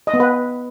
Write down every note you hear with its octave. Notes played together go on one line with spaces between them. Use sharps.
D#5
B3
B4